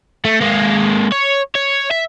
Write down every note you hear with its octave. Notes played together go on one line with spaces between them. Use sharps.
A3
G#3 A#3
C#5
C#5
E5